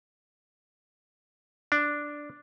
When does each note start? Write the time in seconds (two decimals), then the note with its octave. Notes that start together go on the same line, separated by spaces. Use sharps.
1.72 D4